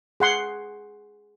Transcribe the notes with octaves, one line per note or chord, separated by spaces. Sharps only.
G#4 F#5 C6